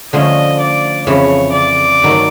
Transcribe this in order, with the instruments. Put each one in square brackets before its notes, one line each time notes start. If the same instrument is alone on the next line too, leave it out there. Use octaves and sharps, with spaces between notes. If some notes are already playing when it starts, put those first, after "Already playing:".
[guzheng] D3 F3 A3 C#4 [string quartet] D#5
[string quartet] D5
[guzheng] F2 C#3 E3 A3 [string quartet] C#5
[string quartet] D5
[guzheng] G2 D#3 F#3 A3